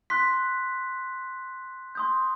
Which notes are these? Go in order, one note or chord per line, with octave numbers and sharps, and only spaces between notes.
C6 F#6 B6
C6 D#6 G6